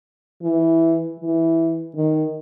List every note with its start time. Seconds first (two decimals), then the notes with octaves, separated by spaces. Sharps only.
0.43 E3
1.20 E3
1.97 D#3